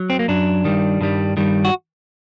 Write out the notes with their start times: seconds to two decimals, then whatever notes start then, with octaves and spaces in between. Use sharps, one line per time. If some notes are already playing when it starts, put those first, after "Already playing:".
Already playing: F#3
0.10 C4
0.19 A#3
0.28 F#2 F#3 D4
0.65 G2 D#3 G3
1.01 G2 D#3 G3
1.37 G2 D#3 G3
1.65 F#4